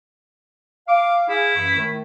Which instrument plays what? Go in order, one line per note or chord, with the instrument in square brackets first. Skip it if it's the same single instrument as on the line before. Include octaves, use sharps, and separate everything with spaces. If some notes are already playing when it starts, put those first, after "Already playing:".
[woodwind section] F5 [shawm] D6
[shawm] E4 [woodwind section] G#4 F5
[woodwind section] F#2 E3 C#6
A2 D#3 A3